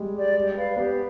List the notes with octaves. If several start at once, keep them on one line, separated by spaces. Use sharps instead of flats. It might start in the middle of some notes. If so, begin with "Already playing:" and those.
Already playing: G3 G#3
G4 D5
G4
B4 D5 F5
B3 G4